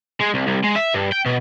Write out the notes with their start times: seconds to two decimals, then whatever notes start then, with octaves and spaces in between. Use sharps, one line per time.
0.21 G#3
0.34 C2
0.47 C2
0.64 G#3
0.76 E5
0.94 G2
1.12 G5
1.26 B2